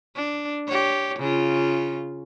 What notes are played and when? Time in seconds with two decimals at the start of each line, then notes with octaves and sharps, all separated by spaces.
0.15 D4
0.67 G4 C#5
1.19 C#3 F4